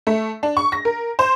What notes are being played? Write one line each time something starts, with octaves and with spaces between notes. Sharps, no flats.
A3
D4
C#6
A#6
A#4
C5